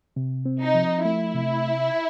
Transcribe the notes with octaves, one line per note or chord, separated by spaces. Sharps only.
C3
C4
D#4
F3
A3 E4
C3